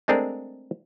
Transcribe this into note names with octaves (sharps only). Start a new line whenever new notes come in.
G#3 A3 C4 D4 G#4 A#4